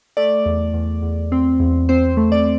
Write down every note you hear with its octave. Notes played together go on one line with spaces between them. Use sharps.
A3 D5
E2
E2
E2
C4
E2
C4 C5
A3
D5